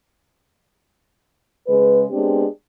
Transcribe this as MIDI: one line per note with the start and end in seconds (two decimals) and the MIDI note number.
1.68 2.04 49
1.68 2.04 56
1.68 2.04 71
2.11 2.45 56
2.11 2.45 59
2.11 2.45 60
2.11 2.45 62
2.11 2.45 67